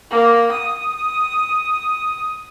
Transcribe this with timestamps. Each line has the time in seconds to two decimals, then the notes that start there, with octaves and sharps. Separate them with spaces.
0.11 A#3
0.52 D#6